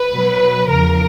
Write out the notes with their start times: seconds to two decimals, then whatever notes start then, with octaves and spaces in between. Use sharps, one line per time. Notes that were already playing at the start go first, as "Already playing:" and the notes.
Already playing: B4
0.11 B2 F#3
0.69 E2 C#3 F3 A#4